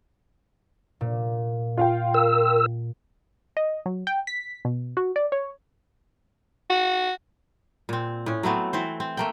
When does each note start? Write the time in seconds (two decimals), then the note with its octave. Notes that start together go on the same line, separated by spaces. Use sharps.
1.01 A#2
1.78 F4 F5 G5
2.14 A#4 E6
3.57 D#5
3.86 F#3
4.07 G5
4.27 B6
4.65 B2
4.97 F#4
5.16 D5
5.32 C#5
6.70 F#4
7.89 A#2 C4
8.26 A2 C#4
8.43 F#3 A3 B3 C4
8.73 E3 C4 C5
9.00 C4
9.17 A3 A#3 G5